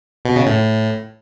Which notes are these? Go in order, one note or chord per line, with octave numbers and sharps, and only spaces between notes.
B2
C#3
A2